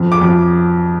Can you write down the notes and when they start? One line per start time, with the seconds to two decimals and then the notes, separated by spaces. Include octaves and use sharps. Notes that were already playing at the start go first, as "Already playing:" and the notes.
Already playing: F2
0.12 D6
0.21 F2